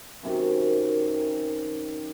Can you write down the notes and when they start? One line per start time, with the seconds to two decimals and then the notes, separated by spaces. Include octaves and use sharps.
0.23 F#2 C3 D#3